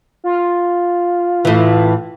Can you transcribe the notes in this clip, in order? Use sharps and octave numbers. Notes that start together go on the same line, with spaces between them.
F4
A2 E3